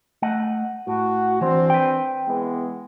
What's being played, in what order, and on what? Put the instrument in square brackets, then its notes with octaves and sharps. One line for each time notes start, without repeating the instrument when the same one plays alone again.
[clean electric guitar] A3 D#5 F#5
[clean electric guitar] A2 [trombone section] F#4
[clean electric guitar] E3 [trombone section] C4 D4 C5
[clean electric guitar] B4 G5
[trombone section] E3 G#3 B3